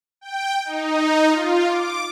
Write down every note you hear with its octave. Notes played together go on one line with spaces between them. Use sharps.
G5
D#4
F4
D6